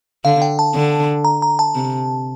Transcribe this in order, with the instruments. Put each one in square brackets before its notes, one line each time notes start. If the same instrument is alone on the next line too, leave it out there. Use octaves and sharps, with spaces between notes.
[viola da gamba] D3 [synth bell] F5
[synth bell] G5
A5
[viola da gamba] D3
[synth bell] A#5
A#5
A5
[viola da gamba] C3